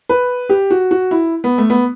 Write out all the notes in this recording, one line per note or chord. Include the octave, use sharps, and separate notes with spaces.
B4
G4
F#4
F#4
E4
B3
A3
B3